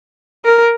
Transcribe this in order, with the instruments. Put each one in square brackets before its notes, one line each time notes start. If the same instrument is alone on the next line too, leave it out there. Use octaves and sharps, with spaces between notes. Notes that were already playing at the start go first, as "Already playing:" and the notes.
[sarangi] A#4